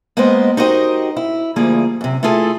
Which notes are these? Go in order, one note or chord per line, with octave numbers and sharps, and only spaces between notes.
G#3 A#3 B3 G4 C5 D#5
D#4 F#4 G4 A#4 C5 D#5
E4
D2 F3 G3 A#3 G#4
F#2 C3
A3 E4 F4 G#4 A4